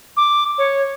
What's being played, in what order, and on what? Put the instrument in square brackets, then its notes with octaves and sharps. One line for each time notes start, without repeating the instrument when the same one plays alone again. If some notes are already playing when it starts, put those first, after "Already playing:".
[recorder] D6
C#5